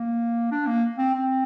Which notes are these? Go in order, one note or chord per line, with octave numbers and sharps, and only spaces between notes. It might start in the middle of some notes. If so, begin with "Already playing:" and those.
Already playing: A#3
D4
A#3
C4
C4